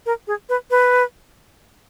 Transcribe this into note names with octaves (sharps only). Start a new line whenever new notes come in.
A#4
G#4
B4
B4